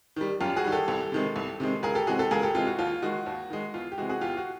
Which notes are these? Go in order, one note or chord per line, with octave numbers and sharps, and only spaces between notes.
D#3 G3
F#2 F4 G4
F#4 G#4
D#3 G3
G4 A4
C2
C3 D#3 G#3
C2
C3 D#3 G#3
C#2 G#4 A#4
G4 A4
C3 E3 G#3 F#4 G#4
G4 A4
C#2 G#4 A#4
G4 A4
C3 E3 G#3 F4 G4
F#4
D#2 F4
D#3 G#3 F#4
D#2
D#3 G#3
E2 F4
G4
C3 E3 G#3 F#4
F#4 G#4
E2 F4 G4
F#4